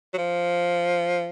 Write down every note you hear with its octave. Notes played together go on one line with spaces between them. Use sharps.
F#3
F3